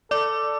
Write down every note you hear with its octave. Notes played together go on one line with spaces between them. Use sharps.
A4 D5 D6